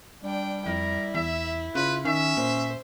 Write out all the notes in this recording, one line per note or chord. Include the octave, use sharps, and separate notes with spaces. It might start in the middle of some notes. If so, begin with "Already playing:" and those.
G3 D4 G5
F2 E4 A#4
E2 E5
C#3 F4 B4
D#3 C#4 E5
A#2 C5